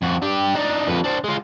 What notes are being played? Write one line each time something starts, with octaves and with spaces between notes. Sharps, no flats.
F2 F#4
D4 G4
D4 D#4
F2 B4
D4 C5
G#3 F4